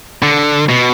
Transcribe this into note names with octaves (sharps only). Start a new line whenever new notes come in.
D3
B2